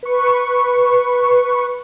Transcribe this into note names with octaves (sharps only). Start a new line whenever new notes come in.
B4 C#6